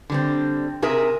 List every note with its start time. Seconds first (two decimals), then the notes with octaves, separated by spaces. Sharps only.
0.10 D3 G3 C4
0.82 C3 G#4 A#4 E5